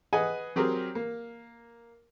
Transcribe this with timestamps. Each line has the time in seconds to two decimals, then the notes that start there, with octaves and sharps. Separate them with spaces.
0.13 G#4 B4 D#5 F#5 G#5
0.56 F#3 C4 G4 G#4 A#4
0.95 A#3